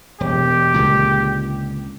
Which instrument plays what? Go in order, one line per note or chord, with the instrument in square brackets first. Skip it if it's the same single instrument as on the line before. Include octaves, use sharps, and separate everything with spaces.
[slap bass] E1 [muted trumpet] G4
[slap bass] C#2 A#2 D3